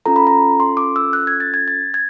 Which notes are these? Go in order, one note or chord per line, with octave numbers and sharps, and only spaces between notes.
C#4 F4 A4 A#5
B5
A#5
C6
D6
E6
F#6
G#6
A6
G#6
A6
G#6